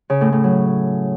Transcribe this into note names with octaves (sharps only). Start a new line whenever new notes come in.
C#3
A2
A2
F#3